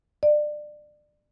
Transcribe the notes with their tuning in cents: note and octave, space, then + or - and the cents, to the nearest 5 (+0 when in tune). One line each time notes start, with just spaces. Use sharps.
D5 +25